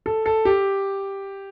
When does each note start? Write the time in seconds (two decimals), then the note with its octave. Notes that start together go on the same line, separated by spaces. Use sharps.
0.06 A4
0.26 A4
0.45 G4